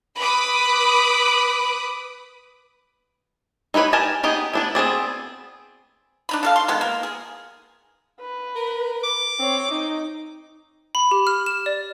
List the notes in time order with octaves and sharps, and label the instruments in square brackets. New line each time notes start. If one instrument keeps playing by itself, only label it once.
[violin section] B4 B5 D6 D#6
[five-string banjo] D#4 E4 G4 B4 C#5
G4 A#4 G#5 A5
B3 D#4 G4 G#4
B3 D4 E4
B3 C4 G#4 D5
[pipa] D4 D#4 B5
D4 A4 F5
C6
D#3 G#3 B3 A4
A#3 A#4
G#4
[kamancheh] B4
[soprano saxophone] A#4
D6
[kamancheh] C4 C#5
[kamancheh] D#4 [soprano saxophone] D#5
[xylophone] B5
G4
F6
E7
D5